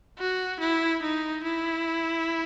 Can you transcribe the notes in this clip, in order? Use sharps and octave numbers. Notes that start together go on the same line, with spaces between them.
F#4
E4
D#4
E4